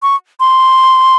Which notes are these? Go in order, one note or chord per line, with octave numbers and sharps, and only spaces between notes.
C#6
C6